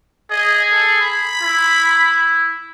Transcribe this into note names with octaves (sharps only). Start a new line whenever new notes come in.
G#4 D#5
A4
B5
E4